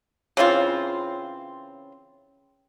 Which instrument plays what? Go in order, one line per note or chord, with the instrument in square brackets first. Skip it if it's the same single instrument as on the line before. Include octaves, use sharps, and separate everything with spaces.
[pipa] C#3 E3 C4 F4